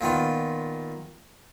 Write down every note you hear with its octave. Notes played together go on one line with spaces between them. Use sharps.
A#2 D#3 B3 F4